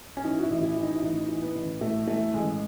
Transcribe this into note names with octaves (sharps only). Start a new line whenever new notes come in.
C#4
E3 D#4
F#4
E4
A1
E4
E3
D#4
E4
A1 D#4
E3
B3
A1
A2 A3
E3 A3
A1 G#3